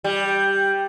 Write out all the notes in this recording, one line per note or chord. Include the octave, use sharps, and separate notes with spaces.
G3